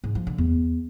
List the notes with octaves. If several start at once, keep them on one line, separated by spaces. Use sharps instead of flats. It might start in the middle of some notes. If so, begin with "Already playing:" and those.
G#2
F3
D3
E2